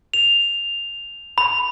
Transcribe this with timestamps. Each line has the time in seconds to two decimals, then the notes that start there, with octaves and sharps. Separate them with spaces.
0.14 F7
1.38 B5